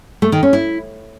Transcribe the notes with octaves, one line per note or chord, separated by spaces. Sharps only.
A3
D#3
C#4
E4